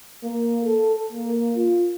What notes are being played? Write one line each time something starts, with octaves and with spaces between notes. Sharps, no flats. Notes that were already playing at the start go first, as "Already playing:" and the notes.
A#3
A4
A#3
F4